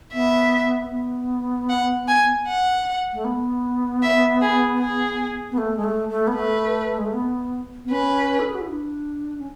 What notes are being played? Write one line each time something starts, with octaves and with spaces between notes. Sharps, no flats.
B3 E5
B3
F#5
G#5
F#5
A3
B3
E5
G#4
G#4
B3
A3
G#3
A3
A3
B3
A3 B4
G#3
A3
B3
B3
C#4 B4
A4
G#4
F#4
E4
D4
C#4